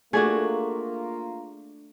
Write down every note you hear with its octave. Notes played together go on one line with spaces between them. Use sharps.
A3 A#3 D4 F4 F#4 G#4